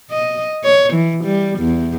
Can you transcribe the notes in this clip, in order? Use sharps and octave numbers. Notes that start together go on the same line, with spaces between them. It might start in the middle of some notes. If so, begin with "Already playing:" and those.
D#5
C#5
E3
G3
E2